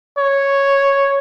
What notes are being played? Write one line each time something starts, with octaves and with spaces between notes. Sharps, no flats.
C#5